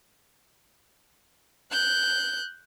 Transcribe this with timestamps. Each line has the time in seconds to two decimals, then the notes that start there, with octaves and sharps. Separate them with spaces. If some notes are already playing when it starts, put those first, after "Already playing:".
1.71 F#6 G6